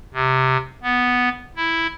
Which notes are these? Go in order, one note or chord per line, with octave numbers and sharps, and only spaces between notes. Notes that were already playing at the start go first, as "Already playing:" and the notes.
C3
B3
E4